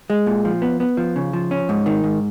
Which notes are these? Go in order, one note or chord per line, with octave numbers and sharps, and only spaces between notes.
G#3
A#2
F3
B3
B3
F3
C#3
F3
C#4
G#2
D#3
G#2